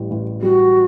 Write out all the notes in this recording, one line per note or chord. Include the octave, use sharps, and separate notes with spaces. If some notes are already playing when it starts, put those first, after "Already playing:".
Already playing: A1 G3
A1
G3 F#4